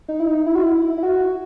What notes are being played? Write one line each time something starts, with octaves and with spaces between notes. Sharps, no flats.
D#4
E4
D#4
E4
F#4
E4
E4
E4
F#4